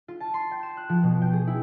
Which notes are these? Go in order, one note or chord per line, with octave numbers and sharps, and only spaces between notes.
F4
A5
C6
G5
E7
F#6
F3
B2
G5
G#4
E4